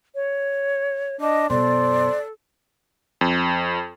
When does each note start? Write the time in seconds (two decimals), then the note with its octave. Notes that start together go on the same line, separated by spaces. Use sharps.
0.15 C#5
1.21 D4 D#5
1.50 F#2 B2 A4 C5 D5
3.21 F2